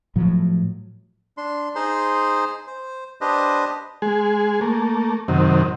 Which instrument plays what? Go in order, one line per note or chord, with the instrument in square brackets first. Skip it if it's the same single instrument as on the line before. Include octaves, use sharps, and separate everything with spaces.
[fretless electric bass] A2 F3 F#3
[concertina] D4 C6
D#4 G#4 C5 C6
C5
D4 G4 B4 C5 D#5
[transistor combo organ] G#3 G#4
A3 A#3
F#2 C3 D#3